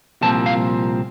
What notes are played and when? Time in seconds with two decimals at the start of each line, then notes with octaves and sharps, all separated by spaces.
0.21 C2 A#2 F3 C4 A5
0.46 F5